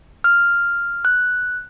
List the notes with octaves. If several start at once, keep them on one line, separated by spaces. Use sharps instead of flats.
F6
F#6